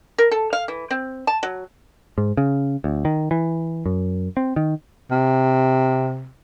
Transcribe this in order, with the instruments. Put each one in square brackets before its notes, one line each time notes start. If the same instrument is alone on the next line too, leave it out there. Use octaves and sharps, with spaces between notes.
[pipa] A#4
A4
F5
E3
C4
A5
F#3
[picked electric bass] G#2
C#3
D2
D#3
E3
F#2
C4
D#3
[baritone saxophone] C3